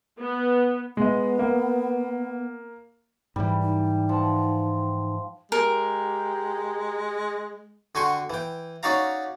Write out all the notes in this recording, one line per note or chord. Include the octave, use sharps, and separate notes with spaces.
B3
G#3 B3 D#5
A#3
G#2 E3 G3
D#4
F3 F#5 A5
G#3 G4 A#4
D3 F#4 G5 G#5 C6 C#6
E3 G5
C#4 D#4 F#4 D5 F5 A#5